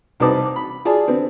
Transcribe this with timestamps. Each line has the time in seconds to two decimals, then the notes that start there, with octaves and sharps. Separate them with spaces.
0.20 C2 C4 D#4 B4 A5 D6
0.56 B5
0.85 F4 G#4 D5 A5
1.07 D3 B3 C4